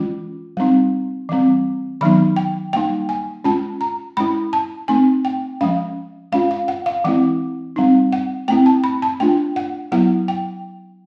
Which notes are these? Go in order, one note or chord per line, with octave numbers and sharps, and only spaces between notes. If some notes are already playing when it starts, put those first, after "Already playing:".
Already playing: E3 G#3 C#4 F4
G3 C4 D#4
E3 G3 C4
D#3 F#3 B3 D#4 B5
G5
G3 A#3 D#4 G5
G#5
G#3 C#4 F4 A5
A#5
G#3 C#4 E4 B5
A5
A3 C4 D#4 G#5
G5
F3 G#3 C#4 F5
G#3 C#4 F4 F5
F5
F#5
F5
E3 G#3 C4 E4 F#5
G3 C4 D#4
F#5
A3 C4 E4 G5
A5
B5
A5
A3 D4 F4 G5
F#5
F#3 B3 E4 F#5
G5